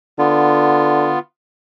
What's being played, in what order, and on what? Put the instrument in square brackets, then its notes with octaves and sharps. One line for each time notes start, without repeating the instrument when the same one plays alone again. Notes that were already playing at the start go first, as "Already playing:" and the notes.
[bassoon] D3 [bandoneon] B3 F4